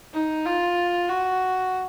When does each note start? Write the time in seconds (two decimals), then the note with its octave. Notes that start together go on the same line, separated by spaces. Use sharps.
0.14 D#4
0.46 F4
1.09 F#4